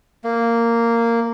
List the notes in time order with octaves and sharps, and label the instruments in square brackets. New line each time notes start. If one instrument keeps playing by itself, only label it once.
[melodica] A#3